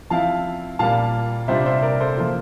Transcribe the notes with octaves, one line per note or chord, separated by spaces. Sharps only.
F3 C4 E4 F5 A5
A#2 G3 A#3 F5 A5
C3 G3 D4 F4 C5 E5
C5 E5
A#4 D5
A4 C5
F3 A#3 F4